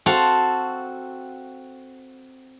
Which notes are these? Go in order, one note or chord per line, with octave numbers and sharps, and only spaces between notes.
C4 F#4 A4 F5